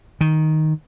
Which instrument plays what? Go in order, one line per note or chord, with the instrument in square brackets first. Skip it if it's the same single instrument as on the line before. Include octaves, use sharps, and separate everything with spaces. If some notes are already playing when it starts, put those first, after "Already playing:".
[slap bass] D#3